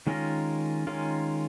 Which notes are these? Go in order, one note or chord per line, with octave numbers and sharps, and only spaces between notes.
D#3 G#3 C#4 F4 A#4
D#3 G#3 C#4 F4 A#4